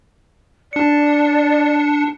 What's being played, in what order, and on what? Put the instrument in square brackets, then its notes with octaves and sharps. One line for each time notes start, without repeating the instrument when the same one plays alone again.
[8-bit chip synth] D4 C#7 [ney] D5